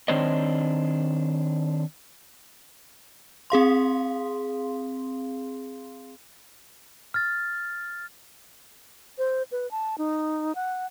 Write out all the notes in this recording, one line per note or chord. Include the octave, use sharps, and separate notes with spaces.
D#3 C4 D4 C5 C#5 D#5
C4 G#4 F5 C6
F6 A6
C5
B4
A5
D#4
F#5